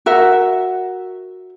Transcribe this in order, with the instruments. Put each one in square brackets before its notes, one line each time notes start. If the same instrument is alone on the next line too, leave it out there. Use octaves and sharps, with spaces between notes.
[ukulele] F#4 A#4 E5 F#5